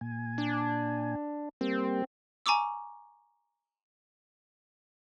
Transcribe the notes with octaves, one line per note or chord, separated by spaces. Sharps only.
A#2 G#5
D4
G3 A#3 C4
G#5 A#5 C#6 D6 E6